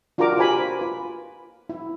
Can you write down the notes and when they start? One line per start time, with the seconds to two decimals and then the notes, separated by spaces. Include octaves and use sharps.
0.18 D4 F4 F#4 A#4 A#5 D6
0.37 F4 G4 C5 G#5 B5 D6
0.79 F4 B4
1.69 E4